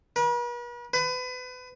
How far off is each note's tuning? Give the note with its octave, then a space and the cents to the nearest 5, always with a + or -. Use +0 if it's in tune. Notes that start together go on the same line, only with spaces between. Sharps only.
B4 -45
B4 +30